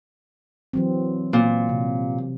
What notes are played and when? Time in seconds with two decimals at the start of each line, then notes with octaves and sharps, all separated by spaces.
0.73 E3 F#3 C4
1.33 A#2
1.69 C3